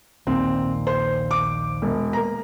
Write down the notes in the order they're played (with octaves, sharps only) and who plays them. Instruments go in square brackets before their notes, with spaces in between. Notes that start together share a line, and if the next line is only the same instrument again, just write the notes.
[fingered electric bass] A#1 D#2 A#2 [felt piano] C4
[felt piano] C5
D6
E1
A#3 A#5